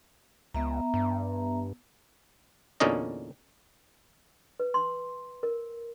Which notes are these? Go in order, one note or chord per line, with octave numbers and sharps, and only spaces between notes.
C#2 B3 E5 A#5
G2
E2 A#2 D3 C#4 D#4 D#5
B4
C6
A#4